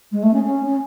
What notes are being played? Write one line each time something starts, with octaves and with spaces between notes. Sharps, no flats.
G#3
A3
C#4
C#4
C#4